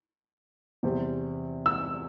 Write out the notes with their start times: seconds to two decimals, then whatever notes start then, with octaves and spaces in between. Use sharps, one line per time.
0.83 E2 C3 G3 C4
1.66 E6